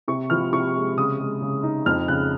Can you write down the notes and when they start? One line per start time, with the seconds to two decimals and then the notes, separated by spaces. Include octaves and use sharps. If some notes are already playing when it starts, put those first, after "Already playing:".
0.08 C3 C#6
0.30 F3 F6
0.52 C3 C#6
0.75 G#3
0.97 C#3 D#6
1.19 G#3
1.41 C#3
1.63 D#4
1.86 F2 F6
2.08 C#3 F#6